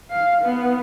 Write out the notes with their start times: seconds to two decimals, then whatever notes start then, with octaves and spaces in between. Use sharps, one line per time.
0.10 F5
0.42 B3